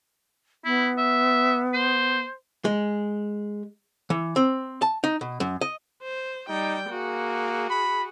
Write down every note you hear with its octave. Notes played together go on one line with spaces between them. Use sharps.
B3 E4
E5
C5
G#3
E3
C4
A5
D#4
B2
F#2
D#5
C5
G3 D#4 G5
A#3 F#4 G#4
B5